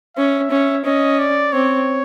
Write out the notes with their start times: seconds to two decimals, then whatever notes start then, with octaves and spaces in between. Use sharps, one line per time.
0.17 C#4 E5
0.51 C#4
0.85 C#4 D#5
1.19 D5
1.53 C4 C#5